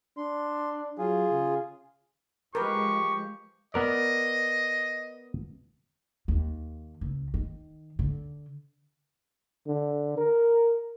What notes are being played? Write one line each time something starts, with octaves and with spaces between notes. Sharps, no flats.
D4 C6
F#3 F4 G#4
C#3
F3 G#3 G4 A#4 B4 C#6
B3 A#4 D5 D#5
D#2
C#2
D#3
D3
D3
A#4